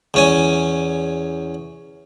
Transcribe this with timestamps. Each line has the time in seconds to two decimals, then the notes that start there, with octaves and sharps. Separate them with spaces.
0.14 E2 C#4 G#5